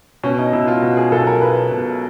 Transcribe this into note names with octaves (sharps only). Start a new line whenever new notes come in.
B2 C#4
D#4
B2 E4
F4
B2 F#4
G#4
B1 A4
A#4
B1 B4
B2